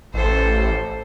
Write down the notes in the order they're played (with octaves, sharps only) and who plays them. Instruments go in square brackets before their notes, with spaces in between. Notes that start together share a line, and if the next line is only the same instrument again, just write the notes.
[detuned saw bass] A1 [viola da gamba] A4 C5